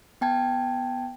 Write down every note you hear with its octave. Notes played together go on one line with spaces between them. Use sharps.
B3 G5 A5 G#6